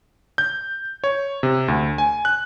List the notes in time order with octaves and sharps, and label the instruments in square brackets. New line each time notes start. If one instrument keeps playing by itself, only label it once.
[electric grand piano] G6
C#5
C3
D2
G#5
F#6